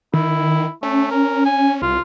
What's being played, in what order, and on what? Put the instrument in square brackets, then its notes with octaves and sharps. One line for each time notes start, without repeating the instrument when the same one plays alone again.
[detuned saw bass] D#3 [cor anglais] E4
[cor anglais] A3 [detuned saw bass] C#4
[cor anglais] A#4
G#5
[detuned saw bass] C2 [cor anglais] F4